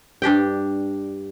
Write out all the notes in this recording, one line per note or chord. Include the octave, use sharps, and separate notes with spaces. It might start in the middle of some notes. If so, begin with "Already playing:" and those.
G2 D4 G4 G5